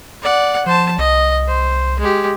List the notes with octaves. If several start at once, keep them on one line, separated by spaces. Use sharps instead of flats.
D5 F#5
F3 C5 A5
C2 D#5
C5
G#3 G4